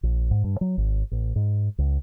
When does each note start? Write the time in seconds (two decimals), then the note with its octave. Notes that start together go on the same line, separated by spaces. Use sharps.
0.03 A#1
0.31 G#2
0.44 G2
0.61 F#3
0.77 G#1
1.11 A1
1.36 G#2
1.78 C#2